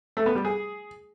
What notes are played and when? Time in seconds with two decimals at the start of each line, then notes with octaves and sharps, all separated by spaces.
0.17 A3
0.26 B3
0.35 G3
0.45 G#4